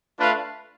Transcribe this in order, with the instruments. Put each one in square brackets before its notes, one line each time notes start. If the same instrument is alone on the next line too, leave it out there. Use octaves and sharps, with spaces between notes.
[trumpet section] A3 D4 F4 B4 F5